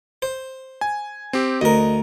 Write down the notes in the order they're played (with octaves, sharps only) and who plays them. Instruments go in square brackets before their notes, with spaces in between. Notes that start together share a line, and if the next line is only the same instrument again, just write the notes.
[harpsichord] C5
[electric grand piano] G#5
C4 G4
[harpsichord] D2 A#4 [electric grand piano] D#5